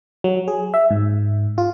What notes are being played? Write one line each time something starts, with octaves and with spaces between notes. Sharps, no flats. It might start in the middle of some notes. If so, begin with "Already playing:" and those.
F#3
G#4
E5
G#2
F4